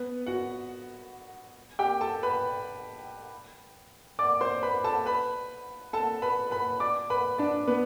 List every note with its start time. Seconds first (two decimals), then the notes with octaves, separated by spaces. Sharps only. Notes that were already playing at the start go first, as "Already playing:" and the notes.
Already playing: B3 B4
0.26 F#4 F#5
1.79 G4 G5
2.01 A4 A5
2.23 B4 B5
4.19 D5 D6
4.41 C5 C6
4.63 B4 B5
4.84 A4 A5
5.06 B4 B5
5.93 A4 A5
6.22 B4 B5
6.51 B4 B5
6.80 D5 D6
7.10 B4 B5
7.38 D4 D5
7.67 B3 B4